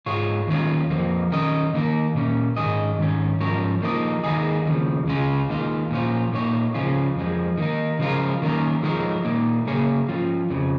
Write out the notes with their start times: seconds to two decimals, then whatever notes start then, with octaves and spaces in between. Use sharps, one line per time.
0.06 G#2 G#3 F4 C#5
0.47 D#2 D#3 C#4 F4
0.90 F2 F3 A#3
1.32 D#3 C#4 A#4 D#5
1.73 D#3 A#3 D#4 A#4
2.15 A#2 A#3 C#4
2.56 G#2 D#3 C#4 G#4 D#5
2.99 G#2 D#3 C#4
3.40 G#2 F3 C#4 A#4 C#5
3.82 F3 A#3 D#4 A#4 D#5
4.23 D#2 D#3 G#3 D#4 G#4
4.66 D#2 C#3 F3
5.07 C#2 C#3 G#3 C#4 F4
5.49 D#2 D#3 G#3 F4
5.91 A#2 F3 C#4 F4
6.33 A#2 A#3 D#4 C#5
6.74 C#2 C#3 F3 C#4 F4
7.16 F2 F3 G#3
7.58 D#3 A#3 D#4
7.99 C#3 F3 G#3 F4 A#4
8.42 D#3 A#3 C#4 A#4
8.83 F3 G#3 D#4 A#4 C#5
9.25 A#2 A#3 D#4
9.67 C#3 A#3 C#4 G#4 C#5
10.09 F3 C#4 F4
10.50 F2 C#3 F3